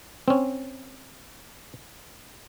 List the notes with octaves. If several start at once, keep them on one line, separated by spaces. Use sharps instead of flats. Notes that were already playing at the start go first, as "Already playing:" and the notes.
C4 C#4